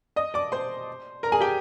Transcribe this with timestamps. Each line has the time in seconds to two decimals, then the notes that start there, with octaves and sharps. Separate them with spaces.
0.16 D#5 D#6
0.34 D5 D6
0.52 C5 C6
1.23 A#4 A#5
1.32 G#4 G#5
1.40 G4 G5